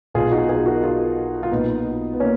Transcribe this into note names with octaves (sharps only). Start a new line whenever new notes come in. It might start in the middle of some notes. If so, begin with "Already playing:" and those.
B1 B2 F4 G#4
D#4 F#4
F4 G#4
F#4 A#4
F4 G#4
F4
B1 A#2 B3 D#4
B3
A#3 C#4